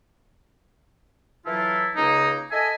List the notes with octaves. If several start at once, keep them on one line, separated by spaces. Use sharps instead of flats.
E3 F#3 E4 F4 A4
C#2 C#3 A#3 D#4
A4 D#5 E5 G#5